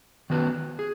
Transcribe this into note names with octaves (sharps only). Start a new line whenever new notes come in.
D#3 B3 F#4 B4
G#4